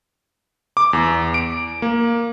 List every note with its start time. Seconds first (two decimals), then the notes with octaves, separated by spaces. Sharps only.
0.77 D6
0.93 E2
1.34 D7
1.82 A#3